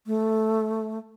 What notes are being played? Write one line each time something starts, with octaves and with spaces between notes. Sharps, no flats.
A3